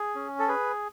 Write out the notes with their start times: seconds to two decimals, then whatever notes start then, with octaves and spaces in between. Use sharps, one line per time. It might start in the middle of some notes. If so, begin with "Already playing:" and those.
Already playing: G#4
0.15 C#4
0.39 A4
0.48 G#4 B4